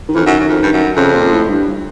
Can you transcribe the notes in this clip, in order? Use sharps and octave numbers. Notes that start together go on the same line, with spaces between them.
D#3
F2 E3
F#2 D#3
F#2
F2
G2
F#2
F2 C#3
A#2
A2
G2